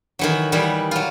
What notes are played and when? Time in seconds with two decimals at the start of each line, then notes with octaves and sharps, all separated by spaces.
0.19 D#3 E3 F#3
0.52 D#3 E3 G3
0.91 F#3 F4